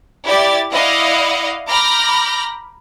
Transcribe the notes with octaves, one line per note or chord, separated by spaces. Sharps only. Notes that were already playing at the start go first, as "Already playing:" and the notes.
E4 G4 D5 A6
E4 D5 D#5 F5 F#5
A#5 B5 D6 F6 G6 A#6